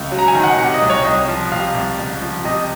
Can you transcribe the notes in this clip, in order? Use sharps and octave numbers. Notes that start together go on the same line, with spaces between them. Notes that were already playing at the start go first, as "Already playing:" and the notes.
Already playing: C#2
F#3
A#5
G#5
D#3
F#5
C3 F#5
D#5
C2
C#5
C2 D#5
F3
C3 F5
C2
C#2
F3
C3 D#5